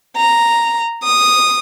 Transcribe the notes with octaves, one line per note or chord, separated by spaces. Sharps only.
A#5
D#6